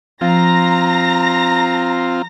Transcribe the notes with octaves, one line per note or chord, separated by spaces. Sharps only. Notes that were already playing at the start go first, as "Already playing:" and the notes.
F3 C4 F4 F5 A#5 A6 A#6